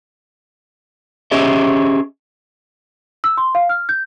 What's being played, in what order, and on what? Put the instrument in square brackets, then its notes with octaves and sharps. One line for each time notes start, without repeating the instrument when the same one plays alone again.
[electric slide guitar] C#4 G4 G#4 D#5 E5
[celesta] E6
C6
F5
F6
G6